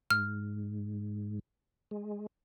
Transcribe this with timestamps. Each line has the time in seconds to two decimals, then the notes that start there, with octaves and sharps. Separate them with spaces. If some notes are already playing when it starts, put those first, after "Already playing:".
0.11 G#2 F6
1.91 G#3